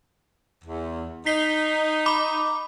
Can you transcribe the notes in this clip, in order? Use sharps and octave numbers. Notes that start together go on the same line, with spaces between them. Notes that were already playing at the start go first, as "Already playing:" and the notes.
E2
D#4 B6 C7 G7
B5 D6